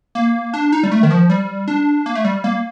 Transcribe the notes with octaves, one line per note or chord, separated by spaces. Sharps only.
A#3
D4
D#4
G3
A3
D#3
F3
G3
D4
A#3
A3
G3
A#3